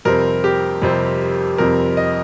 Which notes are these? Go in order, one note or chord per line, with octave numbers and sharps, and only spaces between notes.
F2 C3 G3 C4 A#4
G4
F2 C3 G3 C4
F2 C3 G3 C4 A#4
D#5